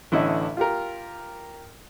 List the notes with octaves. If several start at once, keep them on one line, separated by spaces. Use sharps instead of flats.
A1 D3 C#4 E4 D#5
F4 G4 A#4